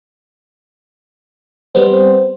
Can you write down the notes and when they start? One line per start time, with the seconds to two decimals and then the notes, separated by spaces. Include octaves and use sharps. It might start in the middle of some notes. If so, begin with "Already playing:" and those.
1.75 G3 B3 C4 C5